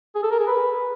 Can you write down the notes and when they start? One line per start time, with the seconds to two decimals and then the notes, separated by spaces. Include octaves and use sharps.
0.15 G#4
0.23 A4
0.31 A#4
0.39 G#4
0.47 B4